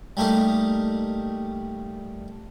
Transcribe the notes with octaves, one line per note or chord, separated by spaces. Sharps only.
G3 A3 A#3 D#4